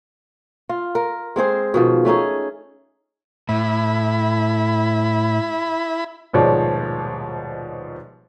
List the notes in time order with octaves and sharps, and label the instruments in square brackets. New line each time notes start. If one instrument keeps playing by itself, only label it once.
[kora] F4
A#4
G#3 C4 G#4 C5
B2 D#3 F3
A3 C#4 D#4 G#4
[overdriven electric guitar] A2 [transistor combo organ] E4 B5
[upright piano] D#1 G#2 B2 F3 C#5 D5